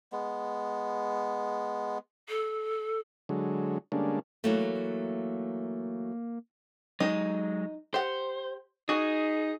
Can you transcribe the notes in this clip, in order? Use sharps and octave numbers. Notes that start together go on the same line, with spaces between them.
G#3 B3
A4
D3 F#3 G#3
D3 G3 G#3 A#3 C#4 D4
E3 F#3 A3 A#3
F#3 G#3 D#4
G4 C5 F#5
D#4 F#4 G#4